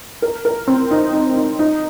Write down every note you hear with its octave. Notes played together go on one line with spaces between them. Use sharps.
A#4
A#4
C4
D#4
D#4
D#4
D#4